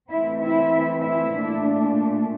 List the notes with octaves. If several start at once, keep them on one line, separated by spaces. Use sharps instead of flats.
E3 A3 C4 E4 E5
E4 E5
E4 E5
A#2 A3 D4